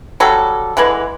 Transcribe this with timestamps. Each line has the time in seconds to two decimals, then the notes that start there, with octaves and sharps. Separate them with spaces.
0.20 F#3 G3 A4
0.77 D3 E3 G#3 B4